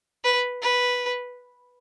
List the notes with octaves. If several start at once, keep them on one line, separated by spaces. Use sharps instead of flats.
B4
B4